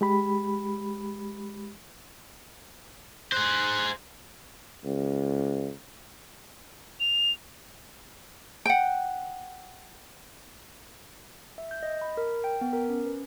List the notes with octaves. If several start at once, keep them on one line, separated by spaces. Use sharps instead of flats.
G#3 G4 B5
G#4 C5 F#6
C#2
F7
F#5 G5
E5
G6
D#5
B5
A#4
G5
B3
A#4
C#4
B4